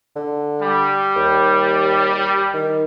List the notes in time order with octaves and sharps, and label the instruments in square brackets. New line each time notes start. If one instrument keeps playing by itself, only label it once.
[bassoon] D3
[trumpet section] G3
[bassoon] D#2
D#3